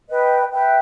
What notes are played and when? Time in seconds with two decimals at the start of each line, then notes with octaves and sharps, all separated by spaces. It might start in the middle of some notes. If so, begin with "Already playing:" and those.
0.08 B4 D#5 G5
0.52 B4 E5 G5